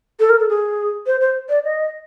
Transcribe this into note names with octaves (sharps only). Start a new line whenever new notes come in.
A4
A#4
A4
G#4
C5
C5
D5
D#5